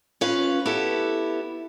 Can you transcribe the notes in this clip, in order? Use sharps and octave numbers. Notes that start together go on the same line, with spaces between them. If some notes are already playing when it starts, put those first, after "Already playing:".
C#4 F4 B4 F5
B3 E4 G4 A4